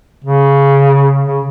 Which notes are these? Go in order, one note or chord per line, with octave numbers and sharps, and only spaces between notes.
C#3
C#3